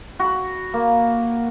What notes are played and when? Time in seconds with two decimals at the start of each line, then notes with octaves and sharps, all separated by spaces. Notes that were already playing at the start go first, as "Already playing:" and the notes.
0.19 F#4 B5
0.74 A#3